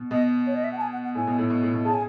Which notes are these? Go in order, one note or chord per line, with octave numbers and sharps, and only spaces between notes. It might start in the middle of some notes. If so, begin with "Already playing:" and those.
Already playing: B2
B2 D#5
C#5
D#5
E5
F#5
A5
G#5
F#5
F#5
A2 G#5
B2
A2
B2
A2
B2
C#3 A5
G#5